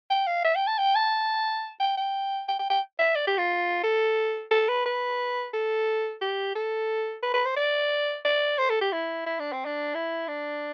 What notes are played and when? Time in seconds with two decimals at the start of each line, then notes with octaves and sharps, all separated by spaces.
0.10 G5
0.27 F5
0.44 E5
0.56 G5
0.67 A5
0.78 G5
0.95 A5
1.80 G5
1.97 G5
2.48 G5
2.59 G5
2.70 G5
2.99 E5
3.15 D5
3.27 G4
3.38 F4
3.83 A4
4.51 A4
4.68 B4
4.86 B4
5.53 A4
6.21 G4
6.55 A4
7.23 B4
7.34 B4
7.45 C5
7.56 D5
8.25 D5
8.58 C5
8.70 A4
8.81 G4
8.92 E4
9.26 E4
9.39 D4
9.52 C4
9.65 D4
9.95 E4
10.28 D4